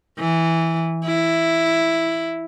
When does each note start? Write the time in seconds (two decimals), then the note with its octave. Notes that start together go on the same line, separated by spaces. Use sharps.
0.20 E3
1.05 E4